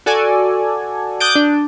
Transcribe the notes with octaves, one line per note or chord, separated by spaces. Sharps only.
F#4 A4 D5 G#5
D6 D#6 F#6 G6 A6 D7
D4